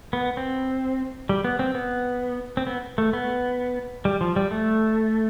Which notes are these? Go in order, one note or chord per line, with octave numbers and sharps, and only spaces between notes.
B3
C4
G3
B3
C4
B3
C4
B3
A3
B3
G3
F3
G3
A3